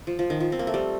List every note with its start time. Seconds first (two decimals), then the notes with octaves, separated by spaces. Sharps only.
0.07 F3
0.19 F3
0.30 D#3
0.40 F3
0.52 C4
0.59 A#3
0.67 A3
0.74 G3